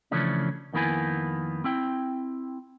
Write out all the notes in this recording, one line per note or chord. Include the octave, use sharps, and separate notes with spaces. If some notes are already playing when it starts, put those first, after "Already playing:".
C#3 E3 F3 A3 C#4 D4
F2 D#3 A#3 B3 E4 G#5
C4 E4 G5